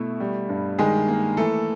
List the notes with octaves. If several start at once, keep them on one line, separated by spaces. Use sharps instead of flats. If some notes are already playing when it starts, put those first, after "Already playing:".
Already playing: B2 A3 E4
G3
G2
D#3 G#3 G#4
A#3
E3 A3 A4